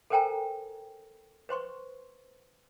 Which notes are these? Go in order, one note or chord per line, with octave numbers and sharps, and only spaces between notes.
A4 A#4 C5 G5 G#5 A#5
B4 C5 C6 C#6